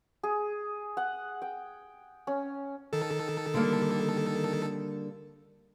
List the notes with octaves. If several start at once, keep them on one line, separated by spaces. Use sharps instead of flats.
G#4
F#5
G5
C#4
D#3 A4
D3 G3 A#3